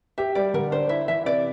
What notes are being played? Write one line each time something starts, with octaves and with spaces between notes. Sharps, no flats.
G4 E5
G3 D5
D3 A#4
D4 C5
E4 E5
E3 E5
C3 D5